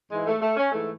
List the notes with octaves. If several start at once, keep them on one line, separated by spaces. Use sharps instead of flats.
G#2 E3 G#3
A3
A3
C#4
G#2 E3 A3